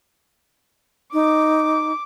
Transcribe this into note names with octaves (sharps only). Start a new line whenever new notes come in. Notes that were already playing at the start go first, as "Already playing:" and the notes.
D#4 D6